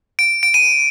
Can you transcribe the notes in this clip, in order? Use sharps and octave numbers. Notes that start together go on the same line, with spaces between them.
D7
D7
D#7